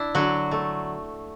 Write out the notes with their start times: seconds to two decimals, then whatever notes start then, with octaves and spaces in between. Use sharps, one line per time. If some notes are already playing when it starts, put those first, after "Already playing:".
Already playing: D4 E4
0.15 D3 F#3 F#4
0.51 A3